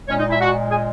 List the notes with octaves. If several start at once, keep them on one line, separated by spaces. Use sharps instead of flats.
A#2 G#3 C#4 C#5
D#4 D#5
E4 E5
F#4 F#5
G#4 G#5